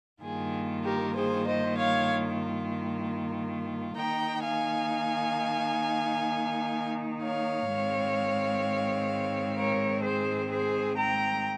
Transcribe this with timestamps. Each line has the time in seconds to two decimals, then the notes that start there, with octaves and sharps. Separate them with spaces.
0.23 G2 D#3 A#3 F4 G#4
0.85 G4 A#4
1.16 G#4 C5
1.47 C5 D#5
1.78 C#5 F5
3.96 D#3 A#3 D#4 G5 A#5
4.43 F5 G#5
7.23 C#5 F5
7.70 G#2 D#3 G#3 C4
9.57 A#4 C#5
10.03 G#4 C5
10.50 G#4 C5
10.97 G5 A#5